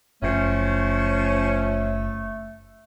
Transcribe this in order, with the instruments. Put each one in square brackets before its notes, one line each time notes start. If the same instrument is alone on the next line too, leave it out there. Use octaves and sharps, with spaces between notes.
[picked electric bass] F#1 [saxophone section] F3 C#4 [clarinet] A3